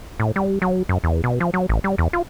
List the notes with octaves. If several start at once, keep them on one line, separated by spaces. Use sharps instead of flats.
A2
G3
F#3
F#2
E2
B2
F3
F#3
A1
G3
E2
F4